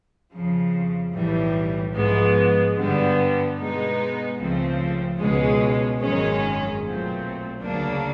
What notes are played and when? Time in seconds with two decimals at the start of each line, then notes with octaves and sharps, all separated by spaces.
0.33 F2 C#3 F3
1.13 B1 A2 E3 G3
1.94 G#2 F3 G#3 B3
2.75 G2 D3 G3 B3
3.56 B2 G#3 B3 D#4
4.37 C#2 C#3 F3 A3 C4
5.18 C#2 B2 G#3 C#4
5.98 G#1 F#2 D#3 G#3 C#4
6.80 B1 A#2 F#3 A3 C4
7.61 D2 C#3 F#3 A#3 D4